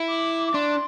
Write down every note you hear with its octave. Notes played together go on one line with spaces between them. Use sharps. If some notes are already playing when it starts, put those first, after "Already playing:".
Already playing: E4
D6
D6
D4 C6